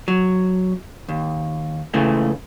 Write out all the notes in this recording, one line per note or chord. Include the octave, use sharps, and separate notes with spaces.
F#3
D#2
C#2 C#3 E3 A3